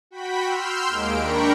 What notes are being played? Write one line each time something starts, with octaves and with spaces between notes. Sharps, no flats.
F#4 G5 B5 B6
C6 E6 F6 G6
D#2 G#3 A#3 D7
D4 A#4 G5 A#5 B5 C#6